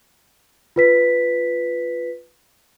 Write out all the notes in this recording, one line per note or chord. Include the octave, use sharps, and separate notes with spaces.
F4 B4 B6